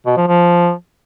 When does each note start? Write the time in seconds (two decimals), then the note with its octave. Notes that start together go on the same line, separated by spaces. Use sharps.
0.06 B2
0.17 F3
0.28 F3